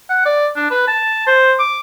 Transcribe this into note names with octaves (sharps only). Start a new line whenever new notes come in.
F#5
D5
D4
B4
A5
C5
D6